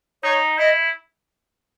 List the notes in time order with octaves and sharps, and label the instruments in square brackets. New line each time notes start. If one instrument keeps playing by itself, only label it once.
[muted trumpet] D#4 [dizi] C#5
[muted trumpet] E4 [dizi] D#5